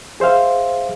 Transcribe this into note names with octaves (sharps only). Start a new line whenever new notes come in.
G#4 C5 E5 F5